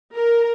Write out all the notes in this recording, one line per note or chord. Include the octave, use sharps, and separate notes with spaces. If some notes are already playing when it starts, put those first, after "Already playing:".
A#4